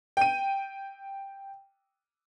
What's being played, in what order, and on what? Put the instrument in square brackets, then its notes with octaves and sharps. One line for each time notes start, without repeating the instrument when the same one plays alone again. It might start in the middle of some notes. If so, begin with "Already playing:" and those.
[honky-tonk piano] G5 D#7